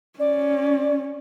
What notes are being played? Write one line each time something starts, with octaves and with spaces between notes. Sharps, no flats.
C#4 D5